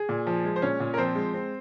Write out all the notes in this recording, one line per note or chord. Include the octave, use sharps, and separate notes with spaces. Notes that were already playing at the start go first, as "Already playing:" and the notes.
Already playing: G#4 G#5
A#2
F3
G#3
C5
A#2 C#4 C#5
A#2
A#4
F3 C4 C5
G#3
C4